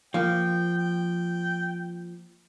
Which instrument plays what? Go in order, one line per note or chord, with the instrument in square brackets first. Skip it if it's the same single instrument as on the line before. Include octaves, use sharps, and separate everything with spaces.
[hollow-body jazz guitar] F3 A#3 [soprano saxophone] G5
[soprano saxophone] G5